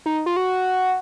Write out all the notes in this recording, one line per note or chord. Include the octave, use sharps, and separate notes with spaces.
D#4
F4
F#4